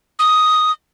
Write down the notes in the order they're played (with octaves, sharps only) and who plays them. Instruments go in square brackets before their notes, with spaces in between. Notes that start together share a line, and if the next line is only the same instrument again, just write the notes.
[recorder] D#6